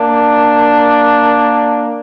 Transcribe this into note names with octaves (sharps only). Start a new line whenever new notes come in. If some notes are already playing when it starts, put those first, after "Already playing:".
Already playing: A#3 D4